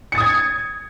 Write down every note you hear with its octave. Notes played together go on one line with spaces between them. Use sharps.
D#6 G#6 A6 C#7